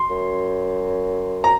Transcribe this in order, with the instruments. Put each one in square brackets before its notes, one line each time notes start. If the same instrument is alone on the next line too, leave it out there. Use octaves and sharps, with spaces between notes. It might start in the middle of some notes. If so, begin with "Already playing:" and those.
Already playing: [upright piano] C6
[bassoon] F#2
[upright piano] A#5